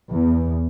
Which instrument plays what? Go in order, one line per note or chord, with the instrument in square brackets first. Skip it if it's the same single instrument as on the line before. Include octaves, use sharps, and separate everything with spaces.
[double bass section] E2